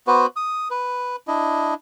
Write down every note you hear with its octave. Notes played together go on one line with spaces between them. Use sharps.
B3 F#4 B4 C5
D#6
B4
D4 E4 D#5